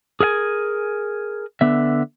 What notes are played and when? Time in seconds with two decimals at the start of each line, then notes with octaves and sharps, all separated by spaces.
0.20 G#4 A#4 F5 G#5
1.61 D3 B3 E5